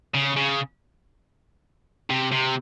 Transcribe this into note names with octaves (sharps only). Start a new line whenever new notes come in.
C#3
C#3
C3
C3